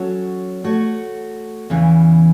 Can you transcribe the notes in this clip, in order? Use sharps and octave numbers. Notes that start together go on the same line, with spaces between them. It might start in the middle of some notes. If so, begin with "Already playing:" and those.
Already playing: F#3 C#4 F#4 A4 C#5
A3 F#4 C#5
E2 C#3 E3